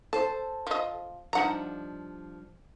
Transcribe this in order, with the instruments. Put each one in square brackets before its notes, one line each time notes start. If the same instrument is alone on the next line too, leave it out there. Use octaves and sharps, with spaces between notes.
[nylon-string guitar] A4 C5 [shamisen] A5
[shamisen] F3 D#5
[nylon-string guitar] F3 G3 D4 [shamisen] D#4 F#5 A#5